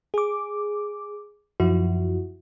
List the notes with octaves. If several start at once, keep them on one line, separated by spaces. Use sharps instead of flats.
G#4 D6
F#2 F3 E4 F#4